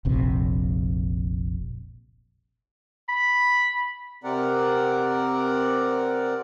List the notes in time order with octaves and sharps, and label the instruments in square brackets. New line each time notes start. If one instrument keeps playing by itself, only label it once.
[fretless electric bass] F1 A#1 C3
[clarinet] B5
[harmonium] C3 C4 A#4 D5 F#5